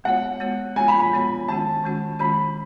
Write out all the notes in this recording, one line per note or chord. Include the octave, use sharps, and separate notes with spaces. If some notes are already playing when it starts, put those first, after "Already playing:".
G#3 B3 F#4 C#5 F#5
G#3 B3 F#4 C#5
G#3 B3 F#4 C#5 G#5
B5
B5
G#3 B3 F#4 C#5
D#3 G#3 C#4 F#4 A5
D#3 G#3 C#4 F#4
D#3 G#3 C#4 F#4 B5